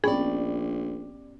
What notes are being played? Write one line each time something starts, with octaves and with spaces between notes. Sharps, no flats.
A#1 B3 C#4 G4 G#4 D5 B5